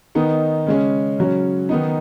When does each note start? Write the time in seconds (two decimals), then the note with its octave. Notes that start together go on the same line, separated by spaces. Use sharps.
0.15 D#3 B3 D#4
0.66 C#3 G#3 C#4
1.18 C#3 F#3 C#4
1.69 D#3 B3 D#4